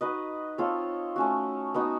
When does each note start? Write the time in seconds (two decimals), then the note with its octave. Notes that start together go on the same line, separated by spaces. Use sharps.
0.01 D#4 F#4 B4 D#5
0.58 C4 F4 A4 C#5
1.16 A3 C#4 F#4
1.74 B3 D#4 F#4